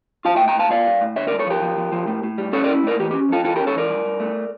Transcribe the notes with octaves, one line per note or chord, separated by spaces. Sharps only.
F4 F5 A5
E5 G5
A2
G5 A#5
A2 F5 A5
F4 D5 F5
G3
A2
D3 C#5 E5
A#4 D5
G2
A4 C#5
F3 G4 A#4
F3
F3
F3
A2
A2
G3
C#4 A4 C#5
A#4 D5
E4
A2 A#4 D5
E3 G4
C#4 G4
F2 F4 A4
E3 F4 A4
C#4 G4 A#4
A4 C#5
E3 A#4 D5
G2
G2
A3